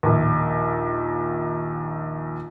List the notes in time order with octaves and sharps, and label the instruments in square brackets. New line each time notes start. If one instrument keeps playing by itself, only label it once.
[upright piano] A#1 D#2